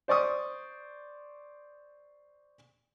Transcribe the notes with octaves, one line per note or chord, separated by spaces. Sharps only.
C5 D5 C#6 D#6